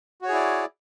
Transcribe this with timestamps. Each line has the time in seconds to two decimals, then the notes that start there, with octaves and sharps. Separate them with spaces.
0.22 F#4
0.25 C#5
0.28 G#4
0.31 E4
0.35 D5